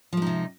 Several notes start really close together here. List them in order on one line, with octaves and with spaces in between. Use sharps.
F3 G#3 D#4 C3